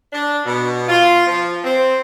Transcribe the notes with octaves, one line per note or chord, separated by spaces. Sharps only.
D4
B2
F4
F3
C4